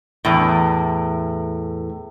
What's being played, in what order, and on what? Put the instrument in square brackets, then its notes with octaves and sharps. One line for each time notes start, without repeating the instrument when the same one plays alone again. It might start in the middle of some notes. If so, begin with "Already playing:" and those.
[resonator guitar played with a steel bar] E2 A2